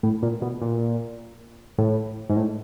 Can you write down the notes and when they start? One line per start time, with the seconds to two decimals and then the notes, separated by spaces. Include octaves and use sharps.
0.03 A2
0.23 A#2
0.42 B2
0.61 A#2
1.78 A2
2.29 G#2
2.36 A2